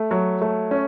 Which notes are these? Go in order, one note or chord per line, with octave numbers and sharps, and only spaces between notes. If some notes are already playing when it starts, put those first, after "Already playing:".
Already playing: A3
F#3
A3
C#4